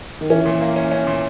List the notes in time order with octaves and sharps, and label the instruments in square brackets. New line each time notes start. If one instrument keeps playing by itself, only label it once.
[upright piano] D#3
[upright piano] E3 [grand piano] C#4
[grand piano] A#2
A#3
C#4
C#4
A#2